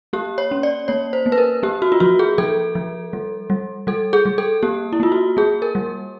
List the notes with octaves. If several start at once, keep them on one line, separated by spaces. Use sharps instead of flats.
A#3 G4
C#5
C#4
D5
A#3 C#5
C5
A#3
B4
A#4
A#3 G4
F#4
F4
F3 F#4
G#4
F3 A4
F3
G3
G3
G3 A4
G#4
G3
A4
A#3 G4
E4
A#3 F4
F#4
A#3 G#4
A#4
G3